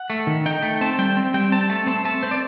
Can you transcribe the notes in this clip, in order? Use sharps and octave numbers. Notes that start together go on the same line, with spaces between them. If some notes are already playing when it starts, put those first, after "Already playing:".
Already playing: F#5
A3
D#3
D#4 G5
A3
C4 A5
G3 G5
C4
G3 G5
C4 A5
A3 A5
C4 A5
A3 A5
C4 C5
D5